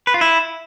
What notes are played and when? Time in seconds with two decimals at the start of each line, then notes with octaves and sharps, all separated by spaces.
0.07 B4
0.14 F4
0.21 E4